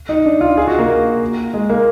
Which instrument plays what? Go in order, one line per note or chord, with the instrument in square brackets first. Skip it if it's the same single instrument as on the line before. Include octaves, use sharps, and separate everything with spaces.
[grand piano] D#4
D4
F4
G#4
F#4
A#3
G#3
A#3